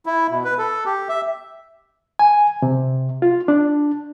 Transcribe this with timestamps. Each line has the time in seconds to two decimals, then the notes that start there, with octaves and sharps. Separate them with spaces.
0.06 E4
0.30 B2
0.45 B4
0.58 A4
0.86 G4
1.09 E5
2.19 G#5
2.62 C3
3.22 F4
3.48 D4